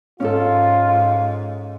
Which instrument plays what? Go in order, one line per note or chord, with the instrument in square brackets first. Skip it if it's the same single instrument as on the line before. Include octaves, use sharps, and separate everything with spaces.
[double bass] G#2 [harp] C#4 A4 [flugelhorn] F4